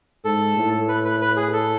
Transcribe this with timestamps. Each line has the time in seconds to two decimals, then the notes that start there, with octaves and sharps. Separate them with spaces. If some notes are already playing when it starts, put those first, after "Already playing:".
0.25 G#2 A4
0.58 A2
0.88 B4
1.05 B4
1.21 B4
1.37 G#4
1.53 A4